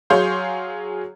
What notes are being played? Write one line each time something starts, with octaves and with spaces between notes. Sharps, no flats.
F#3 G#4 C#5 F5 C6 G6